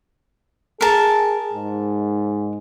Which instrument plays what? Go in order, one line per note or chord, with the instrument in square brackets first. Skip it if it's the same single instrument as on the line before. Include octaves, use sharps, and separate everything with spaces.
[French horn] G#4 [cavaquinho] A#4 A5
[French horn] G#2